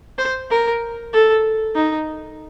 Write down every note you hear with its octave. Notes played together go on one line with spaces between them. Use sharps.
C5
A#4
A4
D#4